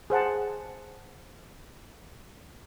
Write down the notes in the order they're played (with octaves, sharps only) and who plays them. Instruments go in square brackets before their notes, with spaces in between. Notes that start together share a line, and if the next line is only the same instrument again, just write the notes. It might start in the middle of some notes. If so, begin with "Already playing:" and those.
[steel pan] G#4 C5 F#5 A5